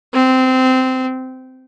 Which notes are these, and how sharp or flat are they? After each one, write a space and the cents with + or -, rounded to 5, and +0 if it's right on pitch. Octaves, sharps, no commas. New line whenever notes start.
C4 -15